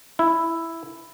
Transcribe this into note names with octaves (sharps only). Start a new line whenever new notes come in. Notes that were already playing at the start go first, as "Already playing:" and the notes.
E4